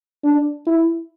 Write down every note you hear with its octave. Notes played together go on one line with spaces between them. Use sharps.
D4
E4